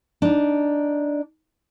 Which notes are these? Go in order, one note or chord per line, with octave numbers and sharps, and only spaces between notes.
D4 D#4